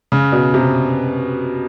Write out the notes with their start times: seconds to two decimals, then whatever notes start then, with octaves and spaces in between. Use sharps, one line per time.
0.12 C#3
0.32 B2
0.54 C3